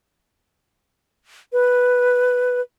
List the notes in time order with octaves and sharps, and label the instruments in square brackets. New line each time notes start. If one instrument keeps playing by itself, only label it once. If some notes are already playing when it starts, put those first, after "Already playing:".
[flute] B4